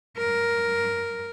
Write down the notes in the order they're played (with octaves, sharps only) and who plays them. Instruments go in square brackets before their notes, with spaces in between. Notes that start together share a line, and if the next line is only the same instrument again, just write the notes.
[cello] A#4